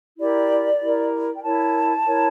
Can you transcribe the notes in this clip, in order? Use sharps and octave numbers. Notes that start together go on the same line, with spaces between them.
E4 G4 A#4 D5
E4 G4 A#4
G5
E4 A#4 C#5 A5
E4 A#4 C#5